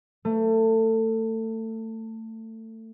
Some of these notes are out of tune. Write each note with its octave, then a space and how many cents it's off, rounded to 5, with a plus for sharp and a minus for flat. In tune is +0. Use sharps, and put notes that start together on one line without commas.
A3 +25